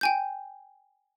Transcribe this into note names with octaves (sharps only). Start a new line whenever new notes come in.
G5 G#5 G6